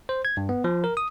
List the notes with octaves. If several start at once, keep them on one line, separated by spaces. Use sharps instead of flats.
C5
G#6
G2
B3
F3
A#4
D#6